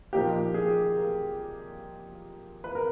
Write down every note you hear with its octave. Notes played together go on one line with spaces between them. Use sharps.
A#2 F3 A#3 D#4 G4
G#4
A#4
B4
A#4